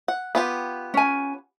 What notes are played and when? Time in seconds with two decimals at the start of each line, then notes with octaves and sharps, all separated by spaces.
0.08 F#5
0.35 B3 F4 G4
0.94 C#4 G#5